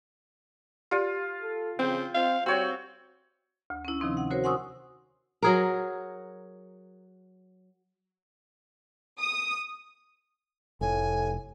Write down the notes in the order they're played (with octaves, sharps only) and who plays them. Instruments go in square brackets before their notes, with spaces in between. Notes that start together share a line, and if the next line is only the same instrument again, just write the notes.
[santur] F4 [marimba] G4 D5
[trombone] A4
[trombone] C#3 [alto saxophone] C4 [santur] G5
[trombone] C4 [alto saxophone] F5
[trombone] G3 [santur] C4 C#5 G5 [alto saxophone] F#4
[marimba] D2
C#4 E4
C3 D#3 F3 C4 D#4
F#5
F#4 A#4 C5 C#5
F#5 G#5 C6 C#6 D#6 E6
[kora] F#3 G#4 A#4
[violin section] D#6
[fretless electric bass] F1 [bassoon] A2 [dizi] G#5